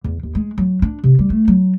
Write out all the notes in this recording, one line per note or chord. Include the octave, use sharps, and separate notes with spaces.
E2
D#2
G#3
F#3
D4
C3
G3
A3
F#3